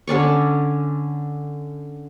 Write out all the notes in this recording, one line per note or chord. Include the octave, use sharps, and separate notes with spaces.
D3 C#4 D5 C#6